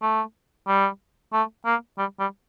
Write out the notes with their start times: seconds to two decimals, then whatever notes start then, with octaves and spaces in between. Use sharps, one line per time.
0.02 A3
0.68 G3
1.33 A3
1.65 A#3
1.98 G3
2.20 G3